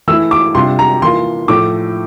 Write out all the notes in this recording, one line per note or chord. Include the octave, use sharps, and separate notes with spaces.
E3 A3 E4 E6
D6
C3 G3 D4 F4 C6
A#5
E3 A#3 F4 C6
A2 F3 A3 D6